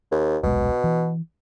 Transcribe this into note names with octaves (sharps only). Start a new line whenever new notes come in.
D#2
D#1 B1 B2 G#3
E3